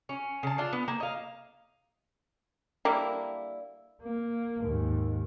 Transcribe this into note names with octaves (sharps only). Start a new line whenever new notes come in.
C#4
C#3 A5
D4 F4
B3
A#3
D#5 F5
D3 G3 A#3 E4
A#3
D#2 G#2